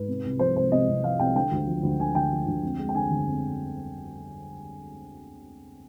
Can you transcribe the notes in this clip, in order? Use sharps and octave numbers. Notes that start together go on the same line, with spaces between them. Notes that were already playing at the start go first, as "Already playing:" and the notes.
Already playing: G#2 B4
C3
C2
F3 C5
C2 C5
C3 D#5
C2
F3 F5
C2 G5
D3 G5
D2
F3
D2
D3 G#5
D2 G5
F3
D2
F2
G#3
G5
D3 G#5
G1
F2